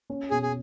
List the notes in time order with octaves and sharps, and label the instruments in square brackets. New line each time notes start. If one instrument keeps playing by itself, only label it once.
[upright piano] C#4
[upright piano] B2 [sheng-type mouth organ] G#4
[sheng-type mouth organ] G#4